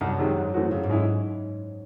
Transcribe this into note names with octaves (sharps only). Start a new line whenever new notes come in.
C2 F#2
C3 D#3 G#3
G#2
E3 A3 C4 F#4
F#2 C#3
G#2
G#3 C#4 E4 G#4